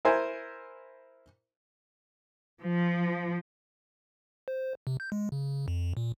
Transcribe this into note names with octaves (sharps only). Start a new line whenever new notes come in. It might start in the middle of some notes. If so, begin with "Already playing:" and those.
E4 A#4 C5 G#5
F3
C5
C3
G6
G#3
C#3
F2
A#2